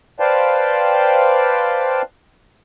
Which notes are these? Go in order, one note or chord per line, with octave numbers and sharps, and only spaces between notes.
B4 C5 D5 F5 G5 A5